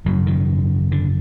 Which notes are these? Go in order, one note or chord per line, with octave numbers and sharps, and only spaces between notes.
G#1 F#2 C#3 F#3
D#3
D3